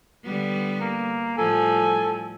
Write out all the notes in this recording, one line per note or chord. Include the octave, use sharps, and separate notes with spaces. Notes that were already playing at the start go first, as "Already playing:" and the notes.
D3 G3 B3
A#3
A2 F3 G3 A4 G#5